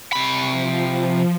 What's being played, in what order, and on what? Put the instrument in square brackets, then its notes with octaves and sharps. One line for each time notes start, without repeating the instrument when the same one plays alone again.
[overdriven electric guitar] C3 B5 [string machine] C#6
[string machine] F3